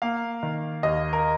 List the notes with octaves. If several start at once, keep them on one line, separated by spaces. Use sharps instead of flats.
A#3 F5
D#3
D#2 D#5
A#4